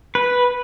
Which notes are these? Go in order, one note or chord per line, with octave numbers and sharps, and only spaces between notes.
B4